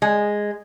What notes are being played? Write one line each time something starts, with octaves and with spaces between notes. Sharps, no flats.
G#3